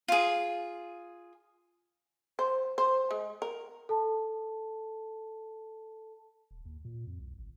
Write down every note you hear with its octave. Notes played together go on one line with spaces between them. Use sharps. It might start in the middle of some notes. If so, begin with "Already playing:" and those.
F4 G#4
C5
C5
G#3
A#4
A4 A5
D#1
D#2
A#2
F2
C2
G#1